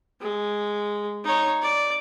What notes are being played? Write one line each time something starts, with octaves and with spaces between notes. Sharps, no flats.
G#3
D#4 C#5
D5